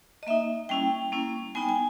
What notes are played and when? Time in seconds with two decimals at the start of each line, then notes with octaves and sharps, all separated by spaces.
0.23 D#5
0.27 A#3 D#4 E5
0.69 G3 A#3 C#4 E4 G5
1.12 G3 A#3 C#4 E4
1.55 G3 B3 D#4 G#5
1.62 G5
1.69 G#5